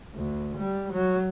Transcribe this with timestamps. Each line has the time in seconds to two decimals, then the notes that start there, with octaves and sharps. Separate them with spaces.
0.15 D2
0.58 G3
0.93 F#3